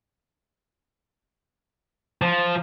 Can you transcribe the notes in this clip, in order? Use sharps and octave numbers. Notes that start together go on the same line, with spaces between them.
F3